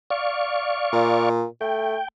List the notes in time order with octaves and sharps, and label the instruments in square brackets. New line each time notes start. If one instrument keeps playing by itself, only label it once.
[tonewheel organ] D5 F5 C#6
[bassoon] A#2
[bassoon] A3 [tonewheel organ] G5